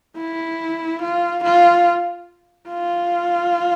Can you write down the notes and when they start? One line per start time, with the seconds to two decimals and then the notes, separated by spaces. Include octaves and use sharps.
0.17 E4
1.02 F4
1.44 F4
2.69 F4